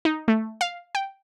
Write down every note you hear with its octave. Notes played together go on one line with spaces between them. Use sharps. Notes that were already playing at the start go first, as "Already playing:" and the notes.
D#4
A3
F5
G5